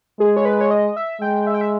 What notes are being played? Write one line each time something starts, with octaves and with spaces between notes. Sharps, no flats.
G#3 G#4
C#5
B4
C#5
D#5
E5
G#3 G5
E5
G5
E5